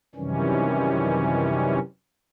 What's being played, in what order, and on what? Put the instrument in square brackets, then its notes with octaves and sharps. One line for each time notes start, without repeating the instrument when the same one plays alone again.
[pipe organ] F#2 C3 D#3 E3 G3 C#4